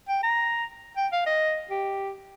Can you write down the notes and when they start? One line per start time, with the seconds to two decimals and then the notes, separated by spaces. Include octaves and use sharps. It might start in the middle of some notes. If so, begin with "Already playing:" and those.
0.08 G5
0.23 A#5
0.97 G5
1.12 F5
1.26 D#5
1.70 G4